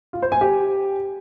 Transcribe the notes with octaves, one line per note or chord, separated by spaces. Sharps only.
F4
C5
G#5
G4